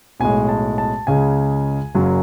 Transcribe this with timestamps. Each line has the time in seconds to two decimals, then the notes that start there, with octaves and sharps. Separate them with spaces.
0.20 B1 A2 G#3 G#5
0.49 A5
0.78 A5
1.07 C#2 C#3 G#3 G#5
1.95 F#1 F#2 C#3 F#3